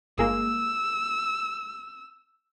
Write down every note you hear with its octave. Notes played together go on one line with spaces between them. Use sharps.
G1 G#3 A#3 E6